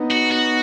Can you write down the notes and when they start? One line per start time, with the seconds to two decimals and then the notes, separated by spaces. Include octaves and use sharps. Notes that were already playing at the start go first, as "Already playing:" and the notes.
Already playing: B3 D#4
0.11 F#4
0.31 F#4